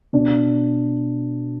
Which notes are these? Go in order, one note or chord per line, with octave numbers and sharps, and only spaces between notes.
B2 D4